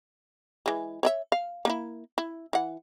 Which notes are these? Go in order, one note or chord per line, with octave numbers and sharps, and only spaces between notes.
E3 G#3
C#5 D5 E5
F5
A#3 D#4 E4
E4
E3 F#5